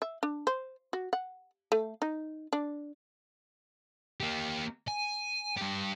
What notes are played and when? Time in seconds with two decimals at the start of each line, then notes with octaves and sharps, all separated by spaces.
0.02 E5
0.23 D4
0.47 C5
0.93 F#4
1.13 F#5
1.72 A3
2.02 D#4
2.53 D4
4.20 A#3 G4
4.88 G#5
5.57 G2 G4